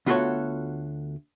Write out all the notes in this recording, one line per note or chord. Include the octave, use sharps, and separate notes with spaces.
D2 B3 F4 F#4 A4 C#5